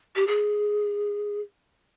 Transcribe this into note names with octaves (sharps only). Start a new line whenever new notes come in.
G4
G#4